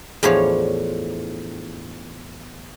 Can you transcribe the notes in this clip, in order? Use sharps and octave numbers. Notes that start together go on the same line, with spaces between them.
E2 A2 F3 D4 C#5 F5